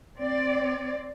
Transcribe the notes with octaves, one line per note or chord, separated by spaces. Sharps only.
C4 D5